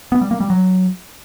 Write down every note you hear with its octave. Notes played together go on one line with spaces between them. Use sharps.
B3
G3
A#3
G3
F#3